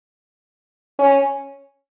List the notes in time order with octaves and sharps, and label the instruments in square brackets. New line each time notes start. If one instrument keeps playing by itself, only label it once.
[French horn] C#4